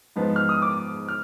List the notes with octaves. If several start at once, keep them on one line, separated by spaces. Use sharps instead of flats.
G#2 F3 G#3 B3
F6
D#6
D6
F6